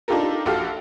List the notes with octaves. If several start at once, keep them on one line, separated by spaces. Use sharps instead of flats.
D4 D#4 F4 G4 A4 A#4
A#1 F#4 G4 A4 F5 F6